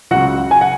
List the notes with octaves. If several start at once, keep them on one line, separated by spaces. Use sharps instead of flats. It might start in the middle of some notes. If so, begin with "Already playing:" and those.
C#2 C#3 F#3 F#4 F#5
G#5
F#5